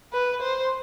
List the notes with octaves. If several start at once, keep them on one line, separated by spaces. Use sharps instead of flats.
B4
C5